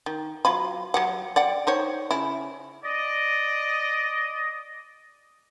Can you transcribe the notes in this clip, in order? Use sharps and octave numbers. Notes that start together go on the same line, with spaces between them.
D#3
F#3 F4 B5
F#3 G4 F#5
D5 F#5 G5
D#4 C5 C#5
C#3 E4
D5 D#5